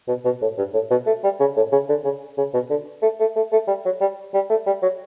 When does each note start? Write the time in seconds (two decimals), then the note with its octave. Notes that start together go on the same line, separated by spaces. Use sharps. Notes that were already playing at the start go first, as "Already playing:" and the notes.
0.08 B2
0.25 B2
0.42 A2
0.58 G2
0.74 A2
0.91 B2
1.06 A3
1.24 G3
1.40 C#3
1.57 A2
1.72 C#3
1.89 D3
2.04 C#3
2.38 C#3
2.54 B2
2.70 D3
3.02 A3
3.20 A3
3.36 A3
3.52 A3
3.68 G3
3.85 F#3
4.01 G3
4.34 G3
4.50 A3
4.66 G3
4.82 F#3